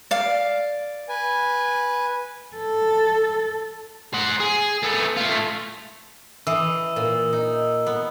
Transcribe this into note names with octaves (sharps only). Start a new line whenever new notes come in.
D5 F5
B4 G#5
A4
C5 F#5
G#4
A3 B3
A3 F4
E3 D#6 E6
A#2
D#4
B3